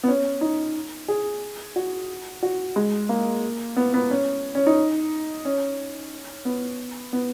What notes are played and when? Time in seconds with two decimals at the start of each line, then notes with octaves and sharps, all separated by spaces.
0.03 B3
0.08 C#4
0.41 D#4
1.08 G#4
1.76 F#4
2.43 F#4
2.76 G#3
3.09 A#3
3.76 B3
3.94 B3
4.11 C#4
4.55 C#4
4.67 D#4
5.45 C#4
6.45 B3
7.13 B3